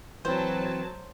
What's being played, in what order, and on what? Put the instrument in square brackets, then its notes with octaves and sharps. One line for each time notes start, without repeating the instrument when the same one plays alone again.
[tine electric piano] E3 C4 [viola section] F#3 A5 [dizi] B4 [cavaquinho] C5